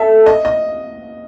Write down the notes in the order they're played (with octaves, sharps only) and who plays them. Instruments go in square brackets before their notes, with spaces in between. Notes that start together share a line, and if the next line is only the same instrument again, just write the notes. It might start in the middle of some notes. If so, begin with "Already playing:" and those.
Already playing: [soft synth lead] A4 [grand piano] E5
[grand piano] D#5
D#5